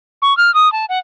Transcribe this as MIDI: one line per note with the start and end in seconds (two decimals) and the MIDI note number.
0.22 0.36 85
0.37 0.53 89
0.54 0.71 87
0.73 0.85 81
0.89 0.99 78